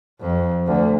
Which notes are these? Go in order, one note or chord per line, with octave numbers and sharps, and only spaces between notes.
F2
D2